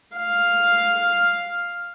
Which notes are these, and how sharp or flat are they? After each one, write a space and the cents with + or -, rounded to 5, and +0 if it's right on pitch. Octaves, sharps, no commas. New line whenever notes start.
F5 +5